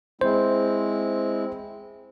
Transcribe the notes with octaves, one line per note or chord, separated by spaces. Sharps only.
G#3 C4 E4 C5